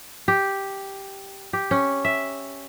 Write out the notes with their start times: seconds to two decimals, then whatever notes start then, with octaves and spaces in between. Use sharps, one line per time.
0.28 G4
1.53 G4
1.71 C#4
2.05 E5